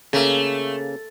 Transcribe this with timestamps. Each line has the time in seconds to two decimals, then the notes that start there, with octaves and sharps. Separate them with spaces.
0.13 C#3 A3 A#3